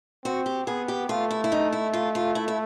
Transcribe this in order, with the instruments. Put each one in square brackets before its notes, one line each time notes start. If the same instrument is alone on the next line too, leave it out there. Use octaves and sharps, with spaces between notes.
[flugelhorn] C4 [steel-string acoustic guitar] F#4
[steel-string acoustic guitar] G4
[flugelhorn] B3 [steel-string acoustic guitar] G#4
[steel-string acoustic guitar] G4
[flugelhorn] A3 [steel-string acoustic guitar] F4
[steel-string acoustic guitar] E4
E4
D#4
E4
F4
F4
E4
E4